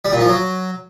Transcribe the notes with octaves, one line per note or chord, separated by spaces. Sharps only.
G3
A#2
F3
F#3